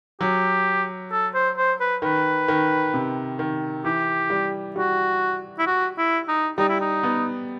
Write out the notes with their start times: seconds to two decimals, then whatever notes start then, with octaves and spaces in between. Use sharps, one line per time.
0.21 F#3 G4
1.12 A4
1.34 C5
1.57 C5
1.80 B4
2.02 D#3 B4
2.48 D#3
2.94 C3
3.39 D#3
3.85 E3 G4
4.30 G3
4.76 G3 F#4
5.59 E4
5.66 F#4
5.98 E4
6.28 D#4
6.58 G3 D#4
6.69 E4
6.80 D#4
7.03 B3